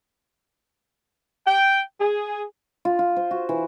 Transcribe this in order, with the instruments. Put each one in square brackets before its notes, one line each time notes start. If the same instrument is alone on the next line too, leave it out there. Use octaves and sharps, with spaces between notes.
[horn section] G5
G#4
[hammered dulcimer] F4
F4
C5
F#4
E3